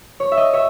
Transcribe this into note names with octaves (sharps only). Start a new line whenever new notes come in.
C#5
E5
D#5
C#5 E5